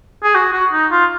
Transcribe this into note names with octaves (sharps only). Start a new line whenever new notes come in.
G#4
F#4
F#4
D#4
F4